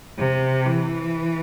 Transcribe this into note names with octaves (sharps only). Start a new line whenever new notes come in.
C3
E3